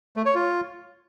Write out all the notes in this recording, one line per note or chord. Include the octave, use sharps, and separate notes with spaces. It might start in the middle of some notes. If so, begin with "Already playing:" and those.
A3
C#5
F4